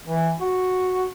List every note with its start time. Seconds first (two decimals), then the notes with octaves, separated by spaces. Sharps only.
0.05 E3
0.41 F#4